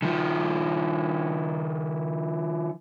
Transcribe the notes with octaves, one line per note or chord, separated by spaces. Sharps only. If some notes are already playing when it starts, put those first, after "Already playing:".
D#3 F3